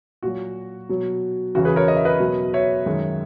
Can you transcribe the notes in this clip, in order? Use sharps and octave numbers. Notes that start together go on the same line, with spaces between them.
A#2 F#3 F#4
B2 F#3
E2 C#3 E3 F#4
G#4 B4
A#4 C#5
D#5
E5
B4 D#5
B2 F#3
C#5 E5
F#2 D#3 G#3